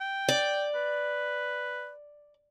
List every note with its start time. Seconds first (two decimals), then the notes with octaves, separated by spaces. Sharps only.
0.01 G5
0.29 D5
0.75 B4